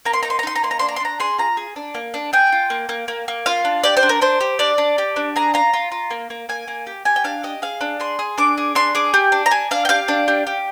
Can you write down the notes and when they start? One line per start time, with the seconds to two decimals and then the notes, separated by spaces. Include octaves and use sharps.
0.05 A#3 A#5
0.13 C6
0.23 D#4 A#5
0.30 C6
0.39 A#5
0.43 D#4 C6
0.56 A#5
0.63 A#3 C6
0.71 A#5
0.79 D4 C6
0.89 A#5
0.96 C6
1.00 D4 A#5
1.20 G#4 C6
1.38 F4 A#5
1.57 G#4
1.76 D4
1.95 A#3
2.14 D4
2.33 G#4 G5
2.52 F4
2.70 A#3
2.89 A#3
3.08 A#3
3.28 A#3
3.46 F4 F5
3.65 D4
3.84 G4 D5
3.97 C5
4.03 D4
4.09 A#4
4.21 D4 C5
4.41 G4
4.59 D4 D5
4.78 D4
4.98 G4
5.16 D4
5.36 G#4 A#5
5.54 F4 A#5
5.73 F4
5.92 F4
6.11 A#3
6.30 A#3
6.49 A#3 G#5
6.68 A#3
6.87 G4
7.05 G4 G#5
7.16 G5
7.24 D4 F5
7.44 G4 D#5
7.62 G#4 F5
7.81 D4
8.00 G#4 C6
8.19 G#4
8.38 D4 D6
8.58 G#4
8.75 D4 C6
8.95 G#4 D6
9.14 G4
9.32 D4
9.46 A#5
9.51 D4 G#5
9.71 D4 F5
9.85 G5
9.89 G4 F5
10.08 D4
10.28 G4
10.47 G4